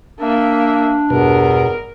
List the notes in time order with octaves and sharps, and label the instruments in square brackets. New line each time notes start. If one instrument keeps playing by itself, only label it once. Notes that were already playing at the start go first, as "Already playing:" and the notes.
[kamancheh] A#3 E5 [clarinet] D4
[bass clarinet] E2 [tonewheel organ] G2 B2 [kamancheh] A#4